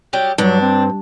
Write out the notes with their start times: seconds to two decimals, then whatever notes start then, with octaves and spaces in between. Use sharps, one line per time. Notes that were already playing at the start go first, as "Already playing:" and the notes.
0.13 F#3 G3 G4
0.38 G2 F#3 D4
0.61 C4